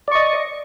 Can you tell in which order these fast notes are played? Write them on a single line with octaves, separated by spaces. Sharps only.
D5 C#6 D#5